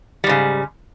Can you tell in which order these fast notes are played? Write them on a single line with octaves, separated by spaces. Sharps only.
G3 G#2 C#3